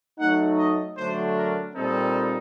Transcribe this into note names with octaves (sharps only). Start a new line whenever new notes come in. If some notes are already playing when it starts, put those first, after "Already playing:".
F#3 A3 D#4 F#5
D#5
D3 F#3 A3 D4 C5
A#4
A#2 G3 C4 D#4 A4